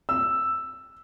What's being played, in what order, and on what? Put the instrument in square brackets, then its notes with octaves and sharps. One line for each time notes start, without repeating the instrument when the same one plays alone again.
[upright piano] E6